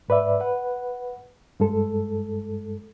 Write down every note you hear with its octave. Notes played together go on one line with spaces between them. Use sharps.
G#2 B4 D5 E5
B4 F#5
G2 G#3 A4